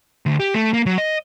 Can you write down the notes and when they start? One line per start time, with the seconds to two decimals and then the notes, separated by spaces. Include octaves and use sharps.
0.26 D2
0.40 G4
0.54 A3
0.73 A#3
0.86 F#3
0.98 D#5